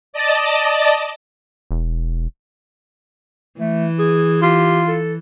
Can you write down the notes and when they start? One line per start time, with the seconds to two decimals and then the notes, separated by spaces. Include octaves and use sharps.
0.13 D5 D#5 A5
1.71 E1
3.60 E3 A3
3.99 G#4
4.42 F4 G4
4.88 A4